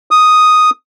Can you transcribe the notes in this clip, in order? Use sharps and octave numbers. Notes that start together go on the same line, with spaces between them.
D#6